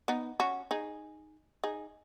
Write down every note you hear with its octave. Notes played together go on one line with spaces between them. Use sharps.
B3 D#4
C#4 F#4
D#4 G#4
D#4 G#4